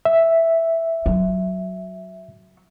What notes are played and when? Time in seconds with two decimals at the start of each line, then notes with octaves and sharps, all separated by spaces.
0.05 E5
1.06 F#3